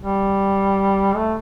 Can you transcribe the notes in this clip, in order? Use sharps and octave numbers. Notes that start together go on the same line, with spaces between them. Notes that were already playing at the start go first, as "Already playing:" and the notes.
G3
A3